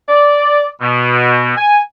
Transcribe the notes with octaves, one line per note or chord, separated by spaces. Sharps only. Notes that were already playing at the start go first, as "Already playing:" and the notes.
D5
B2
G#5